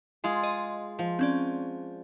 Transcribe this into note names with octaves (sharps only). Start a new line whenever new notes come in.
G#3 F4 G#4
D#5
F3
C4 C#4 D5